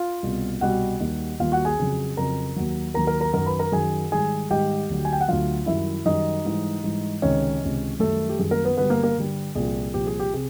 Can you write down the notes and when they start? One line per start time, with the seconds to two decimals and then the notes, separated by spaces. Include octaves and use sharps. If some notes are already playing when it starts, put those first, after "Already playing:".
Already playing: F4 F5
0.23 C2 B2 G3
0.61 C2 B2 G3 F#4 F#5
1.00 D#2 D#3 G3
1.40 D#2 D#3 G3 F4 F5
1.52 F#4 F#5
1.65 G#4 G#5
1.79 F2 C#3 F#3
2.17 F2 C#3 F#3 A#4 A#5
2.56 D#2 D#3 F#3
2.94 D#2 D#3 F#3 A#4 A#5
3.07 A#4 A#5
3.21 A#4 A#5
3.33 F#2 D#3 F#3 A#4 A#5
3.47 B4 B5
3.59 A#4 A#5
3.72 F#2 D#3 F#3 G#4 G#5
4.12 G#2 D#3 G3 G#4 G#5
4.51 G#2 D#3 G3 G4 G5
4.89 D2 D3 F#3
5.05 G#5
5.13 G5
5.21 F#5
5.28 D2 D3 F#3 F4 F5
5.66 F#2 D#3 G3 E4 E5
6.06 F#2 D#3 G3 D#4 D#5
6.45 G#2 E3 G3
6.83 G#2 E3 G3
7.22 C#2 C3 D#3 C#4 C#5
7.62 C#2 C3 D#3
8.00 F#2 D#3 G3 A3 A4
8.29 G4
8.39 F#2 D#3 G3 G#4
8.51 A#3 A#4
8.65 B3 B4
8.77 G2 D3 G3 B3 B4
8.90 A#3 A#4
9.03 A#3 A#4
9.17 G2 D3 G3
9.55 C2 A#2 F3 G#4
9.94 C2 A#2 F3 G4
10.07 G#4
10.20 G4
10.34 C3 G#4